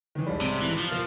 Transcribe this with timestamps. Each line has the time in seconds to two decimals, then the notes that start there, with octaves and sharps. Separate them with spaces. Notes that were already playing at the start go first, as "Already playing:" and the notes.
0.15 D#3 E3
0.27 B1 G#2 G3
0.41 C3
0.61 E3
0.78 F3
0.91 B2 A#3 A6